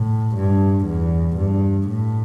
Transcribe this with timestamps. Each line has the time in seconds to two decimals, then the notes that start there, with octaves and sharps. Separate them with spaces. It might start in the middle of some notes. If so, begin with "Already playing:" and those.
Already playing: A2
0.36 G2
0.86 E2
1.37 G2
1.88 A2